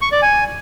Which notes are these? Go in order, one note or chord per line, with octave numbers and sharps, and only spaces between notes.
C#6
D5
G#5